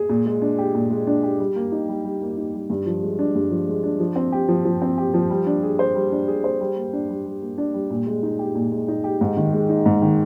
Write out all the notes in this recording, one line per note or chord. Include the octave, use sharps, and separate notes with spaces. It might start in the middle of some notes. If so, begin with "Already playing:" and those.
Already playing: G#4
A#2
G#3
D4
G4
A#2
G#3
D4
G4
G3
A#3
D#4
G3
G3
A#3
D#4
G3
G2
F3
G#3
D4
G2
F3
G#3
D4
F3
C4
G4
F3
F3
C4
G4
F3
G3
D4
G#4
C5
G3
D4
G#4
C5
G3
A#3
D4
G3
G3
A#3
D4
G3
A#2
G#3
D#4
G4
A#2
G#3
D#4
G4
G#2
D#3
G#3
D#4
G#2
D#3